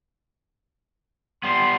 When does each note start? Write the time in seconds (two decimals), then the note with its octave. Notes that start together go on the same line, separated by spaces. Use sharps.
1.43 G3 B3 C6